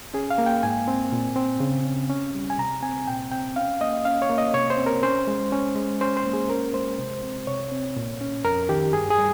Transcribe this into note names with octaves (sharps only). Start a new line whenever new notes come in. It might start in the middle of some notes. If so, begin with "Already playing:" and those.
C#4 G#4
F5
A#3
G5
G#2 G#5
C4
A#2
C4
C#3
C#4
C#4
G3
G#5
C3 A#5
C4 G#5
A#2 G5
C4 G5
C#4 F5
A#3 D#5
C#4 F5
C#5
A#3
D#5
C3 C#5
C5
C4
A#4
C#4 C5
G#3
C#4
G#3
C#4 C5
C5
A#3
G#4
C#4 A#4
G#3 C5
C3
C4
C3 C#5
C4
A#2
C#4
F2 A#4
D#3 G4
G2 G#4
G#4
G3